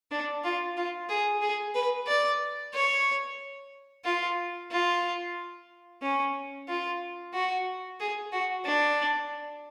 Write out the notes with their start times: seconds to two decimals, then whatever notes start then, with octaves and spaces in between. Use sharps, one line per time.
0.11 D4
0.44 F4
0.77 F4
1.09 G#4
1.42 G#4
1.75 B4
2.07 D5
2.74 C#5
4.05 F4
4.71 F4
6.02 C#4
6.69 F4
7.34 F#4
8.00 G#4
8.32 F#4
8.65 D4